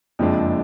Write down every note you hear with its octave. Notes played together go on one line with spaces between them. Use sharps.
F#1 F2 F3 G#3 D4